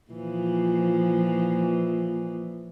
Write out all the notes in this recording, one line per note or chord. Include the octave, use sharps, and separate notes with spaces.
A#2 E3 F3